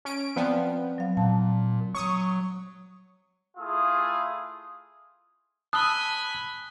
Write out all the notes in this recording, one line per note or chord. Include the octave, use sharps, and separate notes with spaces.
C#4 D7
F3 B3 C4 D5 G5
F#3 F5
A#2 A5
F#3 C#6 D#6
A3 E4 F4 G#4 D#6
G#5 A5 B5 D#6 E6 F#6 G7